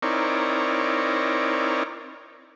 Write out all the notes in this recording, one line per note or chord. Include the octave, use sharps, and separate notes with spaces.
C4 D#4 E4 A#4 C#5 D5